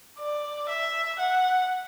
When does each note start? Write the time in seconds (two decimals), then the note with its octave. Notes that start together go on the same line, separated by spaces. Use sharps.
0.18 D5
0.69 E5
1.19 F#5